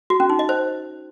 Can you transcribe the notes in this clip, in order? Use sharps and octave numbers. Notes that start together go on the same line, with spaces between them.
F#4
C#4
D#4
D#5
C5